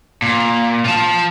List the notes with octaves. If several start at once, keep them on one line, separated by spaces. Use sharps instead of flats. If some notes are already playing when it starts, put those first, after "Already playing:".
A#2
F4 A5